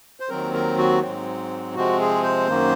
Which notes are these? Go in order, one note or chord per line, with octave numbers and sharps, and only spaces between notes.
C5
D#2 D#3 F#3 C4 A#4
A#4
F#4
G#2 F#3 C4
C3 F3 G#3 C4 F#4
G#4
C5
F#2 D#3 A#3